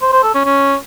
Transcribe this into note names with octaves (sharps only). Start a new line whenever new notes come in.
C5
C5
A4
C#4
C#4